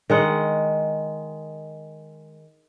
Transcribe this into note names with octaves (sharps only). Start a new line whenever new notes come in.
D#3 G#3 F#5